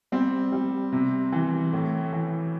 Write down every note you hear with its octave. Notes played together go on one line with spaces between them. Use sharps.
G3 C4
G3
C3
E3
A2
E3